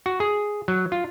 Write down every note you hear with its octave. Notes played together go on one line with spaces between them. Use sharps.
F#4
G#4
F#3
F4